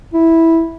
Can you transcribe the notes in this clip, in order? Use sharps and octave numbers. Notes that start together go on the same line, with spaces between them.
E4